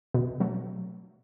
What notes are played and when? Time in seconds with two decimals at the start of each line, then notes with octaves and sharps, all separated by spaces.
0.14 B2
0.40 F#3 A3